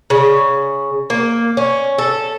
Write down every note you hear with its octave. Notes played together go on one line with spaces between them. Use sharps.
C#3
A#3
C#4
A4